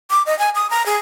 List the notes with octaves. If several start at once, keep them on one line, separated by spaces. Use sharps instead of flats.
D6
D#5
G#5
D#6
A#5
G#4